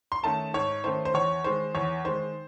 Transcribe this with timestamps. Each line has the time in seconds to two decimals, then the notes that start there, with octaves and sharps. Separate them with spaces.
0.12 C6
0.23 D#3 A3 C#4 A5
0.54 G#2 C#5
0.84 D#3 A3 C#4 C5
1.05 C5
1.14 E2 C#5
1.44 D#3 G#3 C5
1.75 E2 C#5
2.04 D#3 G#3 C5